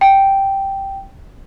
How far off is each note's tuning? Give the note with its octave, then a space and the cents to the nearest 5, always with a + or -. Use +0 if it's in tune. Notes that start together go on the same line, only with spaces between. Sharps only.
G5 -5